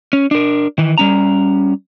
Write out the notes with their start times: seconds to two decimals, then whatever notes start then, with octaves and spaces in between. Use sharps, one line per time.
0.13 C#4
0.31 D4 A#4
0.78 D#3 E3
0.98 G3 C#4 A#5